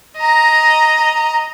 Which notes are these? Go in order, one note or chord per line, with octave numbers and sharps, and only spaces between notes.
D#5 A#5